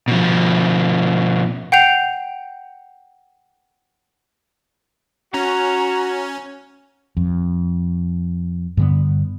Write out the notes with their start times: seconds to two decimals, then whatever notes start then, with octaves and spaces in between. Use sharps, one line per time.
0.08 B2 F3
1.72 F#5 G5 G6 C7 F7
5.34 C#4 F#4 A#5
7.17 F2
8.77 G2 D3 B3